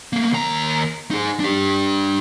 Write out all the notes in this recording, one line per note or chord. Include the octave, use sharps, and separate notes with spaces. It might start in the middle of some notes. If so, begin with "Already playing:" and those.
A3 A#3
D#2 A#5
D#4 G#4
D4 G4